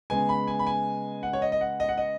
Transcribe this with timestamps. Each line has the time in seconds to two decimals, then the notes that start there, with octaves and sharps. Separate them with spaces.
0.10 C#3 G#3 B3 G#5
0.29 B5
0.47 G#5
0.59 B5
0.67 G#5
1.23 F#5
1.33 C#5
1.42 D#5
1.52 D#5
1.61 F#5
1.80 D#5
1.89 F#5
1.98 D#5